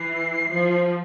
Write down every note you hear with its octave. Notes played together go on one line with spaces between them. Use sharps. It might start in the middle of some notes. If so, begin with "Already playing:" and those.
Already playing: E3 C7
F3